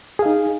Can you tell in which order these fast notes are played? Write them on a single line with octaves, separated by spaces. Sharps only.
G#4 F5 D#4